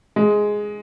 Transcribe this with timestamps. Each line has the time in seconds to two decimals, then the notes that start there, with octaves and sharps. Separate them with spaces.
0.16 G#3